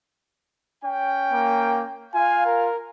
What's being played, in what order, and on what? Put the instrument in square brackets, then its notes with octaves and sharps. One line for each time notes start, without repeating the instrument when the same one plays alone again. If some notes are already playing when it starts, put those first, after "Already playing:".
[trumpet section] C#4 G5
[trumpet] A#3
[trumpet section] F4 F5 [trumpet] G#5
[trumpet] A#4